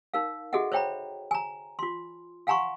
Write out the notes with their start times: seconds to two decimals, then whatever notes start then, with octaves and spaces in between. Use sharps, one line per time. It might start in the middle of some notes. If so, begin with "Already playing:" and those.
0.14 D#4 A#4 F5
0.53 F#4 G#4 A4 D#5 E5 F#5
0.72 C5 C#5 E5 G5 A#5 B5
1.31 G#5 A#5
1.79 F4 C6
2.47 F5 F#5 G#5 A#5 C6 C#6